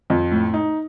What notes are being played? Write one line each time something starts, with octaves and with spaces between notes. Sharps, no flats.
F2
A2
D#4